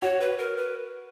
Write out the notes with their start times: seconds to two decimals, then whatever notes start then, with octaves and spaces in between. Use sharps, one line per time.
0.02 F#4 C#5
0.20 B4
0.38 A#4
0.57 B4